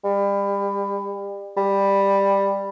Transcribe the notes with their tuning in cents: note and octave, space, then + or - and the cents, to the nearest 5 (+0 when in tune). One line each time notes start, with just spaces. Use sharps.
G3 +30
G3 +10